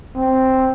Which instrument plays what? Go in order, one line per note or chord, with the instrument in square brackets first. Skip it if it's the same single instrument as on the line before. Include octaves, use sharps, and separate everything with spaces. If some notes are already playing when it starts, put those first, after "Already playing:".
[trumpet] C4